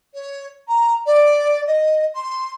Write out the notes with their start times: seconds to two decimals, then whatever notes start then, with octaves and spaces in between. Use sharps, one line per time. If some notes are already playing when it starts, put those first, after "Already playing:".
0.14 C#5
0.68 A#5
1.06 D5
1.67 D#5
2.15 C6